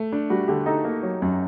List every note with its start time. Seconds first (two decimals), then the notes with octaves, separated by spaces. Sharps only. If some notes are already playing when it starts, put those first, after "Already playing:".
Already playing: A3
0.12 D4
0.30 G3 F#4
0.48 D3 G4
0.66 D#4 A4 D#5
0.85 A#3
1.03 F#3
1.22 F#2